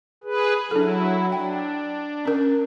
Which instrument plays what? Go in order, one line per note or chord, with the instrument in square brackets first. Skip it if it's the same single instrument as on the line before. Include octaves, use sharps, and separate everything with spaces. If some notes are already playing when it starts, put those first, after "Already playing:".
[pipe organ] G#4 B4
[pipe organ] F#3 E4 [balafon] D4 A4
[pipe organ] D4 [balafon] G5
[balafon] C#4 A#4